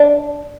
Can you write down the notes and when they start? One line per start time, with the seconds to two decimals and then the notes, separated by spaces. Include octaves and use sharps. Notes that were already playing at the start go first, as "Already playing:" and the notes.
Already playing: D4